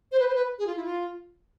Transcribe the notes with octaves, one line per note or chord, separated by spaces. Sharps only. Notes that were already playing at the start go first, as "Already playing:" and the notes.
C5
B4
C5
B4
G#4
F4
E4
F4